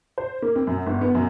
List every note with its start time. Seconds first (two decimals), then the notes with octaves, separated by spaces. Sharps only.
0.18 C5
0.42 A#3
0.55 C4
0.67 F#2
0.86 G1
1.01 B3
1.15 F#2